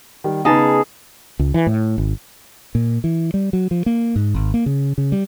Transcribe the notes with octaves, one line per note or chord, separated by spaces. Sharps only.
D#3 G3
C#3 B3 D#4 G#4 A5
C#2
E3
A2
G#1
A#2
E3
G3
F#3
F3
A#3
G#2
G#1
A#3
C#3
C#3
G3